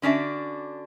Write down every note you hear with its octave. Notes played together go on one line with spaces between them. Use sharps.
D3 C#4 D4 F#4 E5